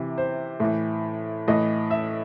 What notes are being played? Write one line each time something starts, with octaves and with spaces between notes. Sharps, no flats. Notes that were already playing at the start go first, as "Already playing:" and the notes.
Already playing: C3 E3
C5
A2 E3
A2 E3 D#5
E5